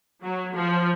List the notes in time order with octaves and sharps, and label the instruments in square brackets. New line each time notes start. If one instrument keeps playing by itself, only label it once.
[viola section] F#3
F3